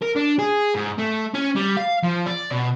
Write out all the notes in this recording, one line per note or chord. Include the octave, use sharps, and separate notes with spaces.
A#4
D4
G#4
G#2
A3
C#4
G3
F5
F3
D5
B2